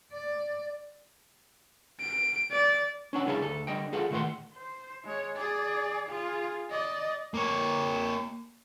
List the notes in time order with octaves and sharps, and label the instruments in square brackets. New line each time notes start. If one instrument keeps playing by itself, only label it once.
[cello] D5
[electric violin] D7
D5
[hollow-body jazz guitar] C#4 D4 F#5
C2 G3 E4 G#4 F5 A5
D2 A4
D3 G3 D#5 G5
G#3 F4 G#4 A4 F5 F#5
A#2 D#3 A3 A4 F#5 C6
[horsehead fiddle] C5
G#3 C#5
G#4 D5
F4 G#4
D5 D#5
[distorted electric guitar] A#3 C#5